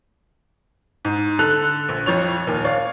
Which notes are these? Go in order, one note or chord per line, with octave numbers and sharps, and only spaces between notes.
G#2
D3 A4 F#6 F7
A#1
F2 F3 C#5 F7
D#2 A#2
C#5 D5 F5